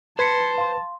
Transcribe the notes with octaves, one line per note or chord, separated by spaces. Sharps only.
B4 C5 A5 G#6 B6 C#7
F5 C6